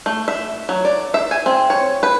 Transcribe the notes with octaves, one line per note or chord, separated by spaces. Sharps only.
A3
E5
F#3
D5
E5
G#5
C4
C#5
B4